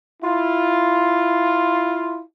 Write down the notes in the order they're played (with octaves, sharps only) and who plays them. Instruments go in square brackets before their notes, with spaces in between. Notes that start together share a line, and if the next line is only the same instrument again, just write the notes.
[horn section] E4 F4